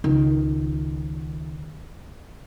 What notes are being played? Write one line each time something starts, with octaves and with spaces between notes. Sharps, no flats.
C#2 D#3